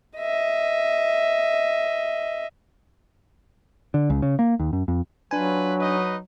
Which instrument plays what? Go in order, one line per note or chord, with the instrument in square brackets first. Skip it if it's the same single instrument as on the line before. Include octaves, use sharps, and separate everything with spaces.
[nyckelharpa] D#5 E5
[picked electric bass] D3
C#2
C#3
A#3
D#2
F#2
F2
[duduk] F#3 [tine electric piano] D4 G#5 [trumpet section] F4 B4
[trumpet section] D#4 B4 D#5